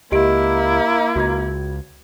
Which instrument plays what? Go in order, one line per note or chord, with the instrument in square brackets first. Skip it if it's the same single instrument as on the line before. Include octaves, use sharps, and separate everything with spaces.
[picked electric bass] C#2 [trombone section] A#3 [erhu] E4 [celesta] G4 D#5 D7
[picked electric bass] C#2 [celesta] F#4 G#6